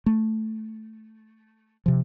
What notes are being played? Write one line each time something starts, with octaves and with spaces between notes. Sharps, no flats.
A3
C3 F3